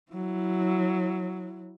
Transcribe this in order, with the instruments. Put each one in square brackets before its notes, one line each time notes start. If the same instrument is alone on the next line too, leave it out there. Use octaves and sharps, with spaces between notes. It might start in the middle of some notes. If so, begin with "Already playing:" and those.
[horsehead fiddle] F#3 E4